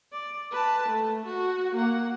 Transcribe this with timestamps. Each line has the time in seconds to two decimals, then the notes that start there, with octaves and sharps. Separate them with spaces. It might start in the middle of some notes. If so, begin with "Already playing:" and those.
0.13 D5
0.51 B4 A5
0.89 A3
1.27 F#4
1.76 A#3 F#5